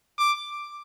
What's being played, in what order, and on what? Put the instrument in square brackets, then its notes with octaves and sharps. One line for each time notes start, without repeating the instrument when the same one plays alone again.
[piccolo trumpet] D6